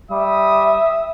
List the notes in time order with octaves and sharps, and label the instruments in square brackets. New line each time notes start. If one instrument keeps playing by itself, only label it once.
[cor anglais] G3 [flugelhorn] E5 [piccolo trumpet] D#6